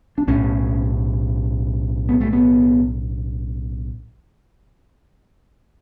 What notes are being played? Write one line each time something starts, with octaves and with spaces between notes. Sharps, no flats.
D4
B1 A2 C#4
B3
A3
B3